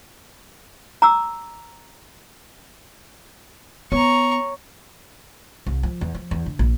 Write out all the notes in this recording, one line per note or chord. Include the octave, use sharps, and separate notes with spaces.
A#5 D6 E6
B3 C#5 A#5 C#6
C2
F3
E2
F3
E2
D3
A#1